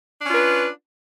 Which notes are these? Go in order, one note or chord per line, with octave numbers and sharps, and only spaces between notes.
C#4 D4 F4 B4